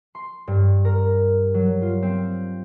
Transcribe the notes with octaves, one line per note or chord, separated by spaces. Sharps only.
C6
G2
A#4
F#3
F4
C4